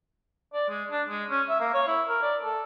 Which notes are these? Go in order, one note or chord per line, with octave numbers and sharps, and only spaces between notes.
D5
G#3
D4
G#3
C#4
E5
A#3
C#5
E4
A#4
D5
A4